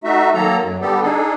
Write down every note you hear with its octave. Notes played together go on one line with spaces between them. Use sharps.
A3 D#4 F#4 E5
D#3 F#3 A#3 A4 A#5
F#2 F#3
D3 G3 B3 G4 A4
D4 D#4 G#4 A4